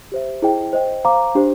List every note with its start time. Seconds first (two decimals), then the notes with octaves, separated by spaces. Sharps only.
0.12 G4 C5 E5
0.42 E4 G#4 C5 D#5 G5
0.73 C5 D#5 G5
1.05 C5 F5 A#5 D6
1.35 D4 G4 C5